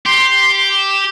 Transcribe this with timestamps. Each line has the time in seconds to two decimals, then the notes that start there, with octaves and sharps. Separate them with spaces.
0.06 G4 C6
0.77 E7